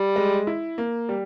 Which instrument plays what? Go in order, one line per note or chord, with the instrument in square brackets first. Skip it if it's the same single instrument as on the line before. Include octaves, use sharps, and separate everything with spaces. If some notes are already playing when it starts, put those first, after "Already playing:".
Already playing: [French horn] G3
[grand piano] G#3
E4
A#3
G3